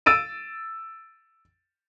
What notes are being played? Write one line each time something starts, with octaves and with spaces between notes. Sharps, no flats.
E6 A6 D7 D#7